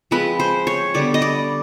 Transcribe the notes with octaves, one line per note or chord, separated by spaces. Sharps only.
F3 G#3 C4 B4
C5
C#5
D3 G3 B3 D5
D#5
D5